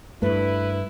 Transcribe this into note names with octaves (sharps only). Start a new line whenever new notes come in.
G2 A3 E4 B4